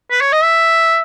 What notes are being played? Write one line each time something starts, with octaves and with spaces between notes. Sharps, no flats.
B4
C#5
D#5
E5